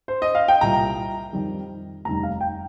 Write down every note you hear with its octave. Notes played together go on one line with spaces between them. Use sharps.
C5
D#5
F5
G5
C2 A#2 G3 A#5
F2 D#3 G3
F1 D#2 D#3 G3 A#5
F5
G5